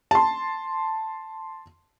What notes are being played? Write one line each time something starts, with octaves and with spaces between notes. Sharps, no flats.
A5 C6